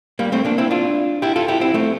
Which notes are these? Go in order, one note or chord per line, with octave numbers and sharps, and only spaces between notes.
G3 A#3
A3 C4
A#3 D4
C4 E4
D4 F4
E4 G4
F4 A4
E4 G4
C4 E4
A3 C4